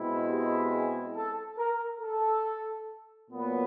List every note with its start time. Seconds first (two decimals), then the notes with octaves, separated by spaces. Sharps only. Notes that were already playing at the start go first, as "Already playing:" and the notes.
Already playing: B2 G#3 C4 E4
0.29 G4
0.72 G#4
1.16 A4
1.58 A#4
2.01 A4
3.30 A#2 F#3 B3